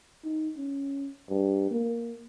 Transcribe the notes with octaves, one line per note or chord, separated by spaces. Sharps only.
D#4
C#4
G2
A#3